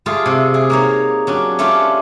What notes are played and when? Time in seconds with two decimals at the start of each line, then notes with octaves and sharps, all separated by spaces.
0.06 G3 A3 F4 G#4
0.26 C3
0.54 G#4
0.70 A#3 D#4 C#5
1.27 F#3 C#4 D4
1.59 A3 C#4 D4 F4 G4